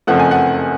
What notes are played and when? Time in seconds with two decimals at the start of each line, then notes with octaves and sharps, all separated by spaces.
0.07 F#1 F2 F3 A3 F#5
0.19 G#5
0.31 F#5